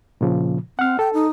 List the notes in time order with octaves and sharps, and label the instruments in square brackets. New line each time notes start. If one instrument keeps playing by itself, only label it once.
[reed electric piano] A#2 C#3 F3
[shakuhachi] C4 [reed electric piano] F#5 F6
[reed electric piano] A4 [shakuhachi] G5
[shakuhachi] D#4